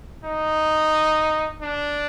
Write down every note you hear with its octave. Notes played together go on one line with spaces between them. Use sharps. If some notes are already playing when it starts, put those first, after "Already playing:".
D#4
D4